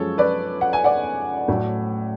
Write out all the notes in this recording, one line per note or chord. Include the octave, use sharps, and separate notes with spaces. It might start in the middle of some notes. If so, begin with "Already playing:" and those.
Already playing: F#2 F3 G#3 A4 C#5
B4 D5
F#5
G#5
D5 F#5
A2 F#3 A3